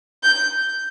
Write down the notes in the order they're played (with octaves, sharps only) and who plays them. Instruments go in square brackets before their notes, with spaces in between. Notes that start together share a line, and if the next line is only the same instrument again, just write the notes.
[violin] G6